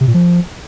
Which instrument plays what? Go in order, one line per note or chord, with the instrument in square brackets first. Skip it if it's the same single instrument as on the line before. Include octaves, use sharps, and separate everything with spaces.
[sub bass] C3
A#2
F3